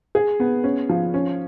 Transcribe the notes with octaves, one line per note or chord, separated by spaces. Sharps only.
G#4
B3
C#4
F3
C#4